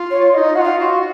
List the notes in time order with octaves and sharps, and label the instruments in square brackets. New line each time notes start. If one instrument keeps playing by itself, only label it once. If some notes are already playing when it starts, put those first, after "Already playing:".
Already playing: [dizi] F4
[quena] C#5
[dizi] D#4 F4 [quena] D#5
[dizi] F#4 [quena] F#5
[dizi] F4 [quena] F5
[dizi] F#4
[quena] F5